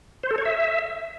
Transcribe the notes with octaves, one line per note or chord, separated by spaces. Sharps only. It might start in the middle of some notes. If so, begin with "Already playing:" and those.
C5
A4
C#5
E5